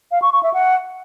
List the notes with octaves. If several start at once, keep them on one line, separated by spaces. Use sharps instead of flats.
F5
C#6
C#6
E5
F#5